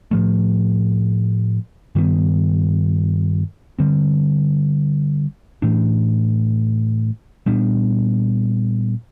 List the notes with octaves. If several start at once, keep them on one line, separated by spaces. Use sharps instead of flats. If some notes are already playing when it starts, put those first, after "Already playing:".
A2 F3 A3
G2 D#3 G3 B3
D3 G3 C4
A2 E3 A3 D4
A#2 G3 B3 D4